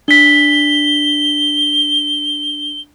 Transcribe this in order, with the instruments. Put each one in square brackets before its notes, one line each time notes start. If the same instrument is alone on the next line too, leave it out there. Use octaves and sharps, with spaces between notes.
[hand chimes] D4 B6 [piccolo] G7